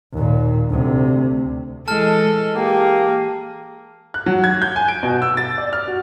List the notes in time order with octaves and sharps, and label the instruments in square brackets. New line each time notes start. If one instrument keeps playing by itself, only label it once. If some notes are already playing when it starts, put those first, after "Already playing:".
[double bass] D#2 A#2
D2 C3
[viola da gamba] E3 G#3 A4 [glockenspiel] A5 F6
[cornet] A#3 [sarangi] G4 [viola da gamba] G#4
[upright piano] F#6
F#3
G#6
G6
G#5
D7
B2
E6
A6
D5
F6
F#4